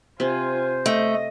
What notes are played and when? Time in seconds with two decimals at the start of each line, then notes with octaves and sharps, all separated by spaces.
0.20 C3 F4 C5 G#5
0.86 A3 D#5